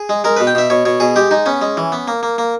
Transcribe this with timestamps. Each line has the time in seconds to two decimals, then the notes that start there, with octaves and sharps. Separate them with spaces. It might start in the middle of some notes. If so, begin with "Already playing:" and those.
Already playing: G#4
0.09 G#3
0.24 G#3 A#4
0.37 B2 B4
0.47 G5
0.55 B2 E5
0.70 B2 C#5
0.85 B2 C#5
1.00 B2 G#4
1.16 G#3 G4
1.31 G#3 D#4
1.46 B3 C#4
1.61 G#3
1.77 E3
1.92 B3
2.08 A#3
2.23 A#3
2.38 A#3